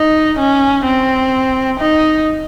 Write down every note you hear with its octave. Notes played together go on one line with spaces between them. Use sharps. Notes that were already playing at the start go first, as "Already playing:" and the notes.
Already playing: D#4
C#4
C4
D#4